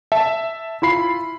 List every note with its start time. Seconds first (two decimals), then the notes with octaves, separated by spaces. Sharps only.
0.12 E5 A5
0.82 E4 F4 B5 C7